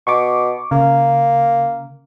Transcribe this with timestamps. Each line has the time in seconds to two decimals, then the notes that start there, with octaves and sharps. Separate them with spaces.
0.07 B2 C#6 D6
0.71 C#3 A#3